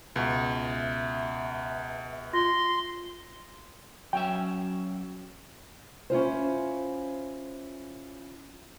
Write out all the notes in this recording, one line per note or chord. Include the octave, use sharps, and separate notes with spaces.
C#2 B2 E5
F4 C6 A#6
F#3 C#4 E5 G5
C#4 E4 F4 C5